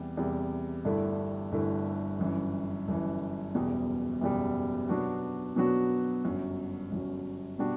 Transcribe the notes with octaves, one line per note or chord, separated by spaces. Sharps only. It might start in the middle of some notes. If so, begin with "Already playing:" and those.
Already playing: E2 C3 G3
E2 C3 G3
G1 G2 D3 A3 E4
G1 G2 D3 A3 E4
G1 F#2 E3
G1 F#2 E3
F#1 E2 B2 G3
F#1 E2 B2 G3
B2 F#3 B3 D4 F#4
B2 F#3 B3 D4 F#4
G1 F#2 F#3
G1 F#2 F#3
B2 G3 D4 F#4